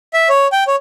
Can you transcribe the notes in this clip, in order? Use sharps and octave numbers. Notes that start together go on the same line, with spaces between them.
E5
C#5
G5
C#5